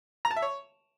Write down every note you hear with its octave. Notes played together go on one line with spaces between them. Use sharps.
A#5
A5
E5
C#5